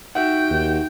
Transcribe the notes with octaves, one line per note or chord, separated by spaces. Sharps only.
D#4 F#4 E5 F#5 G5
D#2